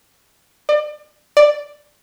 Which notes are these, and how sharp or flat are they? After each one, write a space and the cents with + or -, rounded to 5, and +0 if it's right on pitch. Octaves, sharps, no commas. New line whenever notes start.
D5 +35
D5 +5